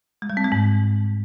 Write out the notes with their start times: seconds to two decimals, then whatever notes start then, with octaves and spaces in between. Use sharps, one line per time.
0.22 G#3
0.30 G3
0.37 C4
0.44 G#3
0.52 G#2